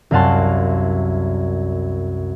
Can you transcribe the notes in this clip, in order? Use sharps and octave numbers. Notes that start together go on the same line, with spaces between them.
C2 F#2 F5 F#5 A5 C6